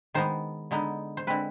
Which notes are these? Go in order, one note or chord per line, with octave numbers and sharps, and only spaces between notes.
D#3 G#3 B3 C5
D3 G#3 B3 D#4
C5
D3 G#3 C4 B4